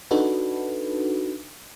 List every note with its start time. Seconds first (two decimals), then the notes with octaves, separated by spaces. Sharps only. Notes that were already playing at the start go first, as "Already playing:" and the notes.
0.11 D4 D#4 F#4 A4 B4